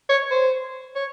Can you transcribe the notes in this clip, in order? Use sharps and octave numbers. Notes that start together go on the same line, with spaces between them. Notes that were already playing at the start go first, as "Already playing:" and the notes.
C#5
C5
C#5